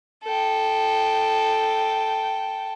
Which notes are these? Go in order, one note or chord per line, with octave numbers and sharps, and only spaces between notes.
A4 G5